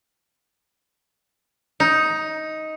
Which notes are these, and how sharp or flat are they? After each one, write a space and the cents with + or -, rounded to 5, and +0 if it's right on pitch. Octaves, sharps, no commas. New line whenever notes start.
D#4 +10